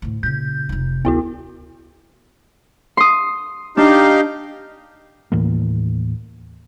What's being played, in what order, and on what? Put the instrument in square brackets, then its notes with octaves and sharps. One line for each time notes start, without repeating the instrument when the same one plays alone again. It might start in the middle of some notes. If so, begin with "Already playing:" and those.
[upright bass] D2 A2
[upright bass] A#2 C#3 [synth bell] G6
[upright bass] F1 D#4
[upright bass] D2 [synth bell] B3 E4 F#4
[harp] C6 D#6
[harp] D4 [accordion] D#4 G4 F5
[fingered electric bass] D#2 A2 E3 A#3